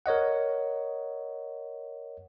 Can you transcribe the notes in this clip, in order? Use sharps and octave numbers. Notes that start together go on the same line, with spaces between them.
A#4 C#5 D#5 F#5